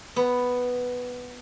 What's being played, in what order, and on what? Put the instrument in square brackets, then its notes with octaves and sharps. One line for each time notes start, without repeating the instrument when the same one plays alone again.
[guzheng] B3